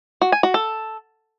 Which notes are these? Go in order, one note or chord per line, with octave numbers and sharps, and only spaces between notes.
F#4
G#5
F#4
A4